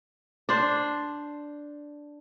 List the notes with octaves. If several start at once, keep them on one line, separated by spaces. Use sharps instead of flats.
D4 C5